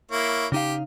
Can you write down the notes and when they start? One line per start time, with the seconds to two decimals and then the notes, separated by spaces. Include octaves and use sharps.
0.11 A#3 E4 C#5
0.52 C#3 D#4 G4 F5